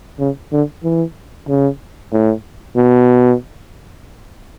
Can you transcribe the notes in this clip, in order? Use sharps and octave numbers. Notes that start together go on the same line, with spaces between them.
C#3
D3
E3
C#3
A2
B2